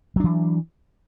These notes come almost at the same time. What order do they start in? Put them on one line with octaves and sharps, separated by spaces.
F#3 D4 E3